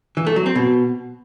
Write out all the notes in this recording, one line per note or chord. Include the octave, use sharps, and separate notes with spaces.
E3
A3
F#3
C4
B2